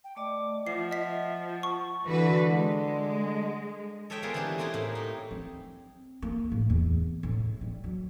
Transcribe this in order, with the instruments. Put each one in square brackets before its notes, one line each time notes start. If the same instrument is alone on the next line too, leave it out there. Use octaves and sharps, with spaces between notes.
[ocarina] G5
[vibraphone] A3 D5 D#5 [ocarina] D6
[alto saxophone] F3 [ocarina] E5 [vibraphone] F#5 [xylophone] C7
[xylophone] D#5 B6
[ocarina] A5 [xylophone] C#6
[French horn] D3 [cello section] E3 F#4 B4
[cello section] G#3
[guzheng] A4 C#5 D#5 E5 G5 A5
G#3 A#3 B3 F4 G#4 A4
E3 G3 C4 D4 G4 G#4
A3 C4 D#4 E4 G4 G#4
A2 A#3
D#4 C#5
[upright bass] C4
A#3
A2
E2
A2
G3
F#3